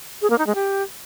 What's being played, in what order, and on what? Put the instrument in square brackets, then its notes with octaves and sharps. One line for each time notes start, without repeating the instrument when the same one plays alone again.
[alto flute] G#4
A#3
D#4
G#3
G4